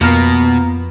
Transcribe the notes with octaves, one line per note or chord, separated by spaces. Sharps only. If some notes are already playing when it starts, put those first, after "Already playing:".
F2 B2 A#3 B3 A#4